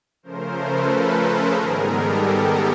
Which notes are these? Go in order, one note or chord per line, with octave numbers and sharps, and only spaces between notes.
C#3 F3 A3 C#4 A#4 C5
A4 B4
G#4 A#4
G#2 D#3 G3 B3 G#4 A#4
G4 A4